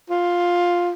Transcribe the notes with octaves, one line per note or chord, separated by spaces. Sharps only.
F4